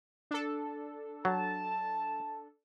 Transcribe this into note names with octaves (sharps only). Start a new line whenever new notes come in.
D4 A4
F#3 A5